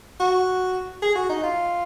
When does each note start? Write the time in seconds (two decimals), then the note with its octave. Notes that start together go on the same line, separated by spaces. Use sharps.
0.20 F#4
1.02 G#4
1.16 F#4
1.29 D#4
1.43 F4